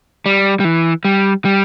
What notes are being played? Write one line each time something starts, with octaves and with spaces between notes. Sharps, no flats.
G3
G3
E3
G3
G3